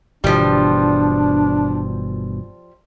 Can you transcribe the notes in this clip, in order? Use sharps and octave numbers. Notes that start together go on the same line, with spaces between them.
G1 B2 E3 F3 G3 D4